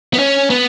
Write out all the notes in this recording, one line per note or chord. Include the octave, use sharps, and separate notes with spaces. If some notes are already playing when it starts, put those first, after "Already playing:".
B3
C#4
B3